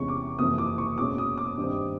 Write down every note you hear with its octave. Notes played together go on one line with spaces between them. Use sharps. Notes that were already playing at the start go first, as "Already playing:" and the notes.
Already playing: E2 C3 E3 G#3 C#4 C#6
D6
F#1 F2 C3 E3 D#6
D6
C#6
E2 B2 G#3 C#4 D6
D#6
D6
G2 D#3 G3 C4 D#4